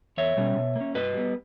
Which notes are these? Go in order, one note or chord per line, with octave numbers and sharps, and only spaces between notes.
E2 C#5 E5
B2 G3 C#4
B2
A#3 C#4
G2 B4 D#5
G3 B3